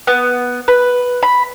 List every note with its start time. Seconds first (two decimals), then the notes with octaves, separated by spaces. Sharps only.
0.07 B3
0.68 B4
1.23 B5